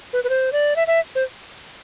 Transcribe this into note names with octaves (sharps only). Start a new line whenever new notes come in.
B4
B4
C5
D5
E5
E5
C5